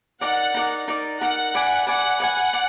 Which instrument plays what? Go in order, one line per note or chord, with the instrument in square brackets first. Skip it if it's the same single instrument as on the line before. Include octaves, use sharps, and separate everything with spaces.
[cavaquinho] D#4 A#4 D5 [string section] F#5
[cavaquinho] D#4 A#4 D5
D#4 A#4 D5
[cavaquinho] D#4 A#4 D5 [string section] F#5
[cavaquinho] B4 D5 G#5
[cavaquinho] B4 D5 G#5 [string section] F#5
[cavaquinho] B4 D5 G#5 [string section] F#5
[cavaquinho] D5 G#5